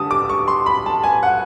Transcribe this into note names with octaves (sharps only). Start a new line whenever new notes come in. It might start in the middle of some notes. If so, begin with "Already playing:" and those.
Already playing: D3 G3 A5 D#6
D6
C#6
C6
B5
A5
G#5
F#5